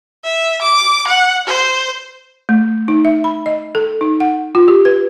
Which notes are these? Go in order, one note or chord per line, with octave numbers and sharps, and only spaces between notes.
E5
D6
F#5
C5
A3
D#4
E5
B5
D#5
A4
D#4
F#5
F4
G4
B4